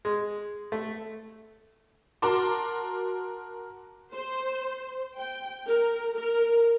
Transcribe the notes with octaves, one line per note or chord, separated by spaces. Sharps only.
G#3
A3
F#4 A#4 A5 C6 D6
C5
G5
A#4
A#4